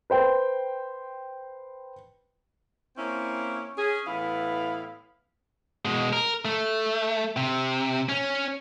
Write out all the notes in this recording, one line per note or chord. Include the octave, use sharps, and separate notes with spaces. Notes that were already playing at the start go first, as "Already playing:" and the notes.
B4 C5 G5
A#3 C4 C#4 E4
C#4 G#4
A2 E3 B3 E4 F5
B2 G#3
A#4
A3
C3
C#4